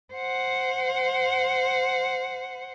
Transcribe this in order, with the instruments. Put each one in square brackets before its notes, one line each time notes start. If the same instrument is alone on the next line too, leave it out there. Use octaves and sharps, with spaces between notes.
[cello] C5 F#5